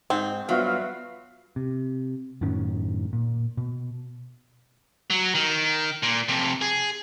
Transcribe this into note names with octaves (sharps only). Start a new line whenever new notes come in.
G#2 C4
G2 F#3 B3 F4 F#4 E5 F5
C3
F#2 A2 D#3 C#4
A#2
B2
F#3
D#3
A#2
F2 C3
G#4